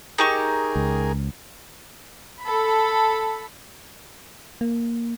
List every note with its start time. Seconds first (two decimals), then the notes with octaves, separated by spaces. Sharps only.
0.18 D#4 G4 G#4 A#4 C#6
0.76 C#2
2.43 A4 B5
4.61 A#3